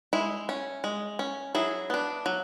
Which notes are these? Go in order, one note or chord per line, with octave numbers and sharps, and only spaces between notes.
G#3 E4
C#4
G#3
C#4
F#3 E4 G#4
B3 D4
F#3